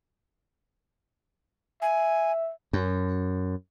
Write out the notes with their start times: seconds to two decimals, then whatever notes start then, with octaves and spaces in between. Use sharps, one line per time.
1.82 E5 G#5
2.73 F#2